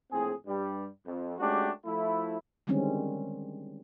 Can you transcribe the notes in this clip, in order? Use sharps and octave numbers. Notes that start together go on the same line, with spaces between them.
A#1 A2 C4 G#4
G2 G3
F2
G#3 A3 C#4 D4 F#4 G4
F3 A3 E4
D3 D#3 G3 G#3 C4 C#4